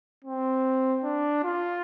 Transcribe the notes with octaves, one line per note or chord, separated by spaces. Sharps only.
C4
D4
F4